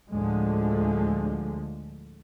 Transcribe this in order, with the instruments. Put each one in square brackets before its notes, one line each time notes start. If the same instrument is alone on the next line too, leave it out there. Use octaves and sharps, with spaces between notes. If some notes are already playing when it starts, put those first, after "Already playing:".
[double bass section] D2 A2 D3 F3 G#3